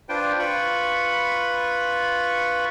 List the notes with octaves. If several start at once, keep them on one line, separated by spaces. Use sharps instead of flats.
D4 F4 B4 C5 G5
F4 B4 B5 C#6